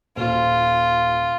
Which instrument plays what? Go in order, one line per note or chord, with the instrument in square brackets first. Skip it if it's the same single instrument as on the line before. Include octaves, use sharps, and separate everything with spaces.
[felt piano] D#1 [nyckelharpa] F4